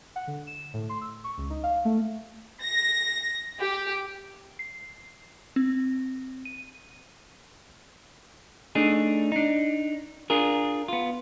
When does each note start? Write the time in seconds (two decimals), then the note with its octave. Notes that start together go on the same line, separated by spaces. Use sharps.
0.16 F#5
0.27 D3
0.47 E7
0.74 A2
0.89 C6
1.01 E6
1.24 C#6
1.38 C#2
1.50 D#4
1.63 F5
1.85 A3
2.63 A#6
3.60 G4
4.59 C7
5.56 C4
6.45 D#7
8.75 A3 D4 D#4 G#4
9.32 D4 D#4
10.30 D4 F4 G#4 A#4
10.88 B3 F4